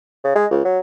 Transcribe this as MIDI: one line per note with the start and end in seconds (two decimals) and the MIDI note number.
0.24 0.31 49
0.36 0.46 56
0.51 0.60 37
0.65 0.79 54